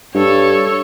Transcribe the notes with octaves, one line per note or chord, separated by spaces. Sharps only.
G2 A4 C#5